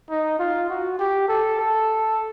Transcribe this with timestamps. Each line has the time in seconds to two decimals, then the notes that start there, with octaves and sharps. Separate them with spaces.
0.10 D#4
0.40 F4
0.70 F#4
0.99 G4
1.28 A4
1.59 A4